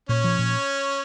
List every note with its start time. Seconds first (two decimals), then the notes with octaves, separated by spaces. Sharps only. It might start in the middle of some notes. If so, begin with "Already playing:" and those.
0.09 A#2 C#4 C#5
0.24 F3
0.39 A#2